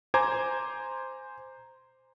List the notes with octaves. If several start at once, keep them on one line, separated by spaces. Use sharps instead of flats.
C5 G#5 A#5 D6 G#6